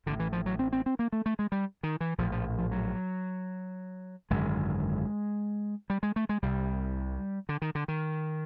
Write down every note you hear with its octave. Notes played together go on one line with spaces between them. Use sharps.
A1 A2 D3
E3
F3
F#3
C4
C4
C4
A#3
A3
A3
G#3
G3
D#3
E3
A#1 A2 F3
F3
F3
F#3
G#1 F#2 D3 G#3
G3
G#3
A3
G#3
C2 C3 G3
D3
D#3
D3
D#3